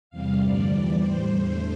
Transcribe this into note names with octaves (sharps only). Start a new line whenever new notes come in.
E2 C3 G3 F5
G2 D3 F3 A3 D5
E2 E3 G3 D5
A2 G3 C5
E2 D3 A3 C5